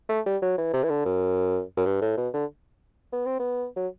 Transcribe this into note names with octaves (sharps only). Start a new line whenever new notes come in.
A3
G3
F#3
E3
C3
E3
D3
F#2
F#2
G2
A2
B2
D3
B3
C4
B3
F#3